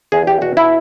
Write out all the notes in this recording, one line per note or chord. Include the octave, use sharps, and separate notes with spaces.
E2 G#4
G4
B2 F#4
E4